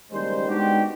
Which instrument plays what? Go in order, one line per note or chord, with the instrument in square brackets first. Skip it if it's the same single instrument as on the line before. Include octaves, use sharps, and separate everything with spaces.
[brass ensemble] F#1 D#2 D#3 G3 G#3 C5
G#3 B3 D4 D#4 F#4 G4